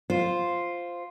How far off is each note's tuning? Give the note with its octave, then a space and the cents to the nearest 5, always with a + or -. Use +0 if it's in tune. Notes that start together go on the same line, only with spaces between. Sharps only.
F4 +0 C5 +0